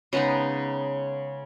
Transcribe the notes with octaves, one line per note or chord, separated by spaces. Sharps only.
C#3 G#3 B3 D#4